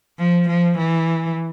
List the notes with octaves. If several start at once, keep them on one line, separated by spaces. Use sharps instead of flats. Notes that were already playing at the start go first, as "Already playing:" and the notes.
F3
F3
E3